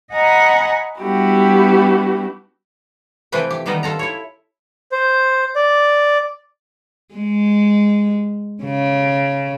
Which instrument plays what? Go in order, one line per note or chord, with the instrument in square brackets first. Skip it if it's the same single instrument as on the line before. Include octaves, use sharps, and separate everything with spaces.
[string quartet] D#5 F#5 G#5 A#5 B5
G3 B3 D4 E4 F#4 G4
[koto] C3 E3 F3 A3 B4 G5
G4
D#3 G3 B3 D#4 D#5
F4 A4 A#5
E4 C#5
[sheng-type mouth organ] C5
D5
[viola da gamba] G#3
C#3